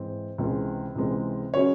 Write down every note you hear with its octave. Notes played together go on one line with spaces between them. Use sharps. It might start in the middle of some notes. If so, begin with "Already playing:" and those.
Already playing: G#2 E3 C4
C#2 C3 E3 G#3 C4
C#2 C3 E3 G#3 C4
C#3 F#3 C#4 C#5